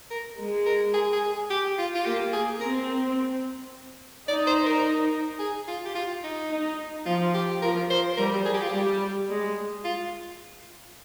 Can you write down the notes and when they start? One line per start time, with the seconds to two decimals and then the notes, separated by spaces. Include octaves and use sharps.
0.11 A#4
0.38 G#3
0.66 A#4
0.94 G#4
1.13 G#4
1.32 G#4
1.51 G4
1.78 F4
1.95 F4
2.05 A#3 G4
2.33 G#4
2.61 C4 A#4
4.28 D#4 D5
4.47 C5
4.66 A#4
5.39 G#4
5.68 F4
5.85 G4
5.95 F4
6.24 D#4
6.51 D#4
7.06 F3 F4
7.34 G4
7.62 F3 A#4
7.90 C5
8.17 G3 A#4
8.46 G#4
8.54 G4
8.62 F4
8.69 G3 G4
9.30 G#3
9.85 F4